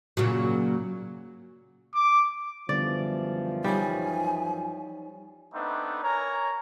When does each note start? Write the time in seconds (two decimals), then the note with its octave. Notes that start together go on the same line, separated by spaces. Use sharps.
0.17 A#2 C#3 F#3
1.95 D6
2.69 F#2 D3 E3 F3 G3 B3 D5
3.64 G3 D#4 C#5 G#5
5.53 A3 B3 C4 D4 D#4 B4
6.03 A#4 C#5 G#5 A#5